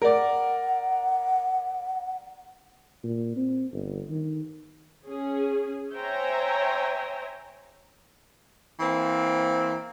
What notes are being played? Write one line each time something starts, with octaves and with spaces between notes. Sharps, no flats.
A#4 D5 F#5
A#2
C4
G1
D#3
C#4 G#4
C5 C#5 E5 G5 G#5 A#5
E3 A#3 C4